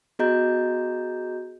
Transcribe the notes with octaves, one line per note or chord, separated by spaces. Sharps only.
B3 F#4 G#4 D#5 A#5 G6